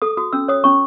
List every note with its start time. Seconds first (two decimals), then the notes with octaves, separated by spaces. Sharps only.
0.02 A4 D#6
0.17 F#4 D#6
0.33 C#4 E6
0.48 C#5 D#6
0.64 C#4 C#6